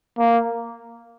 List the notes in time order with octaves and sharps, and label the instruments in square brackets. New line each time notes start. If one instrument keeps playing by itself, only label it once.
[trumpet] A#3